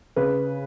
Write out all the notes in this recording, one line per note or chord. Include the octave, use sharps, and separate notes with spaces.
C#3 B4